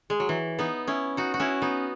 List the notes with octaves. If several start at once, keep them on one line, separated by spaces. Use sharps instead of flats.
G#3
F#3
E3
B3 D#4
C#4 E4
D#4 F#4
F#4
C#4 E4
B3 D#4